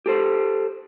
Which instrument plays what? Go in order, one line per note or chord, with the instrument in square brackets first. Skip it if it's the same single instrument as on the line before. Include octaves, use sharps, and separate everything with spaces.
[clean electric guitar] G4 A4 C5